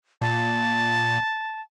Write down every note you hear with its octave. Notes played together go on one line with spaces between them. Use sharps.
A#2 A5